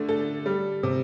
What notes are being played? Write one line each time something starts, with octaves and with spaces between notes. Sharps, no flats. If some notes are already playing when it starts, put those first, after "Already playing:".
Already playing: D3 A3
A4
G3
C3